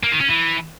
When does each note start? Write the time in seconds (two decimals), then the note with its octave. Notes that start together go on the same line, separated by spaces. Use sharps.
0.03 A#3
0.12 D#3
0.21 C#4
0.29 E3